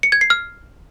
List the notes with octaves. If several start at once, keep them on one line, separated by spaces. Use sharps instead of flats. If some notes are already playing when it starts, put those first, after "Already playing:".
C#7
G#6
C7
F6